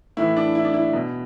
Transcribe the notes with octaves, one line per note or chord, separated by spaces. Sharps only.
A2 E3 E4
D4
E4
D4
E4
B2